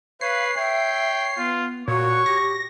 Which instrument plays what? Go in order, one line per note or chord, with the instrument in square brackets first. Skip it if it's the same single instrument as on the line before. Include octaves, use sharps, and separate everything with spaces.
[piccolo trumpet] B4 [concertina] C#5 [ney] F5 [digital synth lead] C7
[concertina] C#5 [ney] E5 [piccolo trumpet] G5
[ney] B3 [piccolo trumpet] F4
[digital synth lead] A#2 [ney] F#4 [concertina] C#5 [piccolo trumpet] C#6
[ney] G4 [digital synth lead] A#6